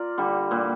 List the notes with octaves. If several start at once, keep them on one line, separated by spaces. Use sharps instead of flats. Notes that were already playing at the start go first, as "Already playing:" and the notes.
Already playing: F4 A#4 D5
D3 G3
A#2 G3